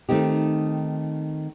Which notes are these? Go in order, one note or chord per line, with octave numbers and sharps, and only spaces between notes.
D#3 A3 C4 D#4 G4